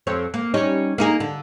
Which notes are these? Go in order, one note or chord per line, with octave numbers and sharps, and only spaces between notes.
F2 C4 C#5
A#3
G3 C#4 D#4
A#3 D#4 G#4
D3